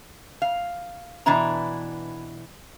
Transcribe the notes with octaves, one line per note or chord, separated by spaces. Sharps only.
F5
B2 E3 D4 E4 A#5